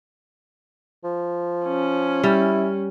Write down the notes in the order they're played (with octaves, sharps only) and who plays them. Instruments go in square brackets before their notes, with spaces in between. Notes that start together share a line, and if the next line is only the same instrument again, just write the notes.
[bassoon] F3
[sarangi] C#4
[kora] G3 [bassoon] E4